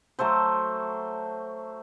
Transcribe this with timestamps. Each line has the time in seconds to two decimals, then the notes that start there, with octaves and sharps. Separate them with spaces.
0.19 F#3 A3 A4 C5